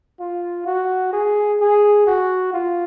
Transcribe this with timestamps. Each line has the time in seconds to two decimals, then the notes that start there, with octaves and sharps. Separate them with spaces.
0.20 F4
0.66 F#4
1.13 G#4
1.60 G#4
2.07 F#4
2.53 F4